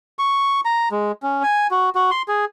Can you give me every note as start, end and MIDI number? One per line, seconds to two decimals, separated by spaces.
0.19 0.61 85
0.65 0.89 82
0.92 1.12 56
1.23 1.43 61
1.43 1.67 80
1.71 1.90 66
1.95 2.10 66
2.11 2.22 84
2.28 2.45 68